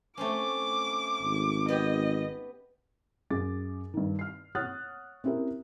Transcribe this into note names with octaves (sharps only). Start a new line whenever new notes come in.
A3 C4 C#4 D6
G#1
B3 G4 D#5
F#2 C#4 G#4 D6 A6
G2 D#3
F6 C7
C#5 F#5 D#6 F6 F#6 A6
C4 C#4 E4 G4 A#4